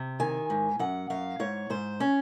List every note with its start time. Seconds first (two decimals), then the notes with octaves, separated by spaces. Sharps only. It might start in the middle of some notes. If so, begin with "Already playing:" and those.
Already playing: C3
0.20 D#3 G#5
0.50 G#2
0.79 F#2 F#5
1.10 F#2 F5
1.40 G#2 C#5
1.70 G#2 C5
2.00 C#4